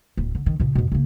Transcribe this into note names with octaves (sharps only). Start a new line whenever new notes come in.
D1 C4
D3
D#3
A#2 C#3
F2 B2
C#3 A#3